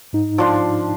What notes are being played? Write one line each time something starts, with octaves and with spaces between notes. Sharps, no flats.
G#2 D#4
F3 D4 C6